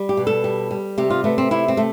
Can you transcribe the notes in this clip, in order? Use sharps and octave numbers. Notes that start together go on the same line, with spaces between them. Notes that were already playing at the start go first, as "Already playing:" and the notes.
Already playing: G3
G4
B2
A4
G3
G3
C3 G4
F4
A3 B3
C4
C3 E4
C4
A3